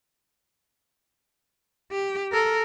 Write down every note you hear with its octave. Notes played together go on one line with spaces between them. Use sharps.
G4
A4 A#4